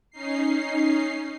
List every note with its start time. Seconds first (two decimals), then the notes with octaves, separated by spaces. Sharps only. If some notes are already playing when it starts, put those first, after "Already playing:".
0.11 C#4 D#4 C7